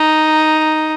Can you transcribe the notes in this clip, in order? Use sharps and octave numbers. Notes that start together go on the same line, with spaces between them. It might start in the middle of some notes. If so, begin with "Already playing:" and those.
Already playing: D#4